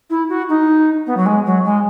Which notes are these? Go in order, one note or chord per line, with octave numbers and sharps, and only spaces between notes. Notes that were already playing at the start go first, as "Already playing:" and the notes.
E4
F#4
D#4
B3
F#3
G#3
F#3
G#3